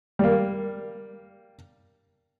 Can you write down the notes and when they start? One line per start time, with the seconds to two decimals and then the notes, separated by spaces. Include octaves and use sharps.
0.19 G3 A#3